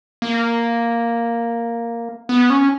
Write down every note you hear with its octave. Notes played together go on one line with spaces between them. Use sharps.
A#3
B3
C#4